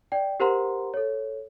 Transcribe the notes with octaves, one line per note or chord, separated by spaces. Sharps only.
D5 G5
G4 A#4 C5 F#5 A#5 C6
A4 C#5